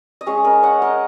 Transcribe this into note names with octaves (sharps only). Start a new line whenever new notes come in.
D#5
G#3 C#4 G#4 C#5
A#4 D#5
C#5 F#5
A#4 D#5